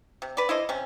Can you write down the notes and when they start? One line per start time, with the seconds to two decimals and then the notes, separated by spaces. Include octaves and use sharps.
0.22 C3
0.37 B4 D5
0.49 E4 A4 C5 D#5
0.69 C3 C#4